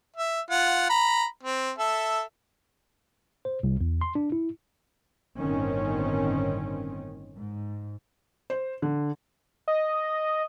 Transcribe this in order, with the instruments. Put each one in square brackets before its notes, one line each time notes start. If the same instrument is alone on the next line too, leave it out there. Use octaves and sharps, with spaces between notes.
[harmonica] E5
F4 F#5
A#5 B5
C4
A4 E5
[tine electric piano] C5
C2
E2
C6
D4
E4
[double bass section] G1 A2 D#3 C4 C#4
G#2
[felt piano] C5
D3
[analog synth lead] D#5